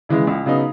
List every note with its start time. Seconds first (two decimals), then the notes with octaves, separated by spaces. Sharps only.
0.09 C#3 E3 G#3
0.27 C#2
0.46 C#3 F#3 B3 D#4